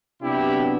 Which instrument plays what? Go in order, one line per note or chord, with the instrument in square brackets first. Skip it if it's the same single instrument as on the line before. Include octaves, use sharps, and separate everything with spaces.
[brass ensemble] C3 F#3 B3 D4 E4 G4